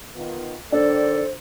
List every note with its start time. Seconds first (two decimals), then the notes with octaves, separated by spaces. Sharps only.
0.15 D#3 B3 F4
0.72 D#3 D4 A4 C5 D5